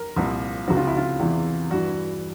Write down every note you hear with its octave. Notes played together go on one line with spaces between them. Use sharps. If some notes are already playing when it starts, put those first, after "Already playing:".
Already playing: A#4
C2 A#2 F3
C#2 C3 F3 F#4
F4
E4
F4
E2 C3 E3
G2 E3 F#4